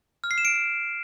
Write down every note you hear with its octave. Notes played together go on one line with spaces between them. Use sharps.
F6
C7
E7
D7